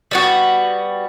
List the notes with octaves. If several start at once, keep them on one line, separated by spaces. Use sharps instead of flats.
G3 B3 F#4